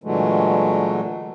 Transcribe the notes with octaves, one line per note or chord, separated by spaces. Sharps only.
A#2 D3 E3 F#3 G#3 A3